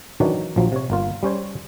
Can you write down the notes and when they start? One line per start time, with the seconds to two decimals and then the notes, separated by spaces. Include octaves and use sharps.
0.20 D#3 E3 F#3 C#4 D4
0.56 A#1 F3 F#3
0.72 C3 C#5
0.90 G1 A#3 F4
1.23 G3 C#4 C5 C#5